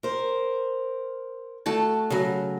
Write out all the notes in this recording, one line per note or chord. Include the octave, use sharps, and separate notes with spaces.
A#4 C5
A3 F#4 A5
C#3 F#3